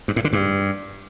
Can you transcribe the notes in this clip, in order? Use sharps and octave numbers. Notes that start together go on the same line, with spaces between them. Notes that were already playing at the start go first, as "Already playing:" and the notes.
G2
A2
D3
G2